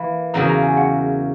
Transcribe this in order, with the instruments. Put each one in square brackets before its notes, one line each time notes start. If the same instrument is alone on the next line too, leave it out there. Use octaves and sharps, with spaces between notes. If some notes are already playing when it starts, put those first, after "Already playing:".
Already playing: [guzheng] E3 A#3 [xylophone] B5
[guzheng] E2 C#3 F#3 A#3 [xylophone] A#5
[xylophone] A#5
G#5
F#5